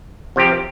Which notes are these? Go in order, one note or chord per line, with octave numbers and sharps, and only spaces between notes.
C3 F3 C4 G4